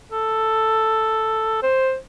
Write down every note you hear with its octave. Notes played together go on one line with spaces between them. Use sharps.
A4
C5